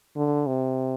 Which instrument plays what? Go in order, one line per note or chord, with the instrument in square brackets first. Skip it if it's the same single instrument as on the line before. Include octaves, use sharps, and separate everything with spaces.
[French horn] D3
C3